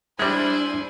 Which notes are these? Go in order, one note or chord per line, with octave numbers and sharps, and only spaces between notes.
G3 G#3 D4 E4 C5 G#5